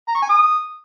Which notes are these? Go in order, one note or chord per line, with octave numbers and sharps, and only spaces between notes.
A#5
C#6
G#5
D#6